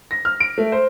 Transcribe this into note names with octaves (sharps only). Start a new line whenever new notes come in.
A#6
F6
D7
A3
C5